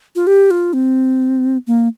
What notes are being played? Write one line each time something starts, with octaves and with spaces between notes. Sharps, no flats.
F4
G4
F4
C4
A#3